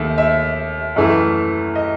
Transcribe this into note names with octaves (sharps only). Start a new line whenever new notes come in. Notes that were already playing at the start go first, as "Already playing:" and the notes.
Already playing: D#2 D#3 A3 E5
E5
F#2 E3 A3
D#5